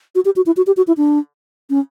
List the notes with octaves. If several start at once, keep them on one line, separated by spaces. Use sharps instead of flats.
F#4
G4
F#4
E4
F#4
G4
F#4
E4
D4
C#4